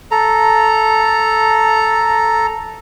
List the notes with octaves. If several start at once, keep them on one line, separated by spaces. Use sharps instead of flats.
A4 A#5